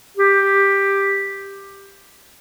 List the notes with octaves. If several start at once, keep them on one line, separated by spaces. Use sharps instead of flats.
G4